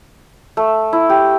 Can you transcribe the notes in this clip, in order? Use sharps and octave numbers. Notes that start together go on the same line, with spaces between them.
A3
E4
G4